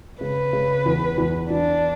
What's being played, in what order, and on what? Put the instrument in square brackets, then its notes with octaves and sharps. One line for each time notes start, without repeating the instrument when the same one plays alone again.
[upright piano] C#3 [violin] B4
[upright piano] C#3
E2
E2
[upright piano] E2 [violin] D4